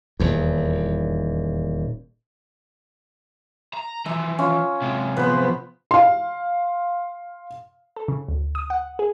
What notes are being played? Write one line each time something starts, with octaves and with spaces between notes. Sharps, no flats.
D#1 E2
A#5
E3 F3 E5
C#4 F4
C3 G#3
F3 B3 B4 C5
F5 C6
A4
C#3
D2
D#6
F#5
G#4